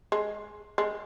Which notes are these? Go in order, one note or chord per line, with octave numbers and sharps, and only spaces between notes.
G#3
G#3